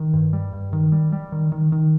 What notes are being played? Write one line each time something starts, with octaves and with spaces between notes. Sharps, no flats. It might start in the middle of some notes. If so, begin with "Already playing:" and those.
Already playing: D#3
G2
G3
G2
D#3
G3
G3
D#3
D#3
D#3